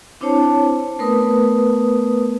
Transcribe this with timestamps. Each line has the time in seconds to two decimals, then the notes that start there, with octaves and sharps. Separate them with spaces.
0.21 C4 D4 E4 C5 C#5 A5
0.99 A3 B3 A#4 B4 D#6